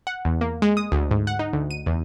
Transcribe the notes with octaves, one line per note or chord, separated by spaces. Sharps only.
F#5
E2
A#3
G#3
D#6
D2
G#2
F#5
D#4
D2
D#7
E2